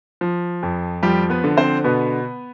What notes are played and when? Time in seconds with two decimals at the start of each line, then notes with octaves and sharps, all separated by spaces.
0.21 F3
0.63 F2
1.03 F3 G3 G4
1.30 B3 B4
1.44 D3
1.57 C4 C5
1.84 B2 B3 B4